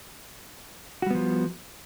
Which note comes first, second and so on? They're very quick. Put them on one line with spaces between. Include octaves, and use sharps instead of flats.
F#4 G3 B3 F3